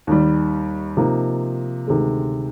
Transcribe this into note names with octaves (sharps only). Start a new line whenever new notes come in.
D#2 D#3 G3
C3 F3 A#3 D#4
D2 C3 D#3 G#3